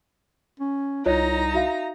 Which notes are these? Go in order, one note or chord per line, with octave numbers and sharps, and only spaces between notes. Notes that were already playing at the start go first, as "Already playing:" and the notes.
C#4
C2 D#4 F4 C#5 D#5 A#5
F#4 E5 F5